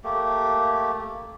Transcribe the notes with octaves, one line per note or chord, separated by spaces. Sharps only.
A3 A#3 G4